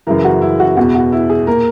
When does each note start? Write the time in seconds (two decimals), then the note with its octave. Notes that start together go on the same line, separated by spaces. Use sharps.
0.07 F#2 C#3 E3 A#4
0.24 F#4
0.41 E4
0.60 F#4
0.77 E2 B2 F#4
0.95 F#4
1.12 E4
1.30 G#4
1.47 A#2 A#4